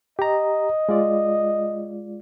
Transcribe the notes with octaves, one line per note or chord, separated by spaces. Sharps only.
G4 D#5 A#5
G#3 F4 D5